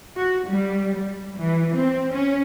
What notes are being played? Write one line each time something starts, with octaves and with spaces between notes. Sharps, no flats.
F#4
G3
G3
E3
C4
C#4